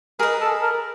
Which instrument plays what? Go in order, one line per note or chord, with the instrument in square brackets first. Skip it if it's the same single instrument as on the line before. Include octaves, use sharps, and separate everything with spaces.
[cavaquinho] G#4 [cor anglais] A#4
[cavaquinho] B4 D#5
[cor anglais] A4
A#4